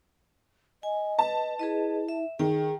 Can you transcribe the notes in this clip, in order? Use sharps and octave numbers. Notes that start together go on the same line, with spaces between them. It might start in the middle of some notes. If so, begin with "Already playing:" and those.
D#5 G#5
B4 A5
E4 G#4 B4 D#5
E5
D#3 G#4 G5